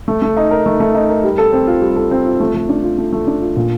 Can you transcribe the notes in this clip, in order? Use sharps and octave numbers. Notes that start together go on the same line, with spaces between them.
A3
A3
D#4
A#4
A3
A3
D#4
A#4
G3
A4
C4
F4
G3
A4
C4
F4
A3
A3
D4
F4
A3
A3
D4
F4
A#2